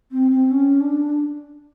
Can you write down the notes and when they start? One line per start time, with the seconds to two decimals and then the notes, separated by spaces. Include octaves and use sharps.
0.12 C4
0.31 C4
0.51 C#4
0.81 D4